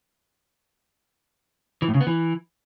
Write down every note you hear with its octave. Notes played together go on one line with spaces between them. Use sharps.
E3
A2
C#3
B3
E3